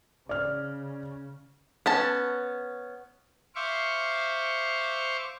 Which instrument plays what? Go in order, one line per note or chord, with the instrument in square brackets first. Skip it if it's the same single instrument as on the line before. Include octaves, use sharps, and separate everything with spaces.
[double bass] C#3 [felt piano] D5 F6
[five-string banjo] B3 C#4 A5
[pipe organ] C5 E5 F5 C#6 D6